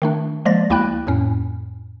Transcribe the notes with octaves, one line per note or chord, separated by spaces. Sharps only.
D#3 A3 D4
F3 G#3 A#3 D5 A6 A#6
D2 A#3 E4 G5 B5 F#6
F2 A2 C#4